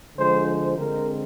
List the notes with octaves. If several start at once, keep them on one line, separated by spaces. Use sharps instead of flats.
D3 F3 G#3 C5
C5
D3 G#3 C4 A#4